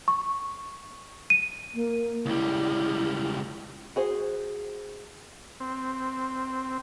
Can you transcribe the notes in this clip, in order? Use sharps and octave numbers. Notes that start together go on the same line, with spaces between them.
C#6
D#7
A#3
C#2 G3 E4
F#4 G#4 C5
C4